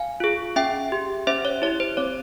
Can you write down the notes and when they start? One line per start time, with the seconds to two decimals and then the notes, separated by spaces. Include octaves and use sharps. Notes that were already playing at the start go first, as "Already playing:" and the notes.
Already playing: F5 G#5
0.20 F4 G#4
0.56 C#4 E5 G5
0.92 G4
1.27 C#4 C5 E5
1.45 C#5
1.62 E4 G4 C#5
1.80 C5
1.97 C4 C#5